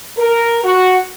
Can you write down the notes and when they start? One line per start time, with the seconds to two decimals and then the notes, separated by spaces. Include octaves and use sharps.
0.18 A#4
0.64 F#4